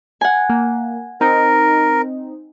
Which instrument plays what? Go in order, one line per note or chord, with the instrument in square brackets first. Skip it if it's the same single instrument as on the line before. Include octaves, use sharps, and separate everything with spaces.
[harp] F#5 G#5
[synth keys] A#3
[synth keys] C4 D#4 [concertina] A#4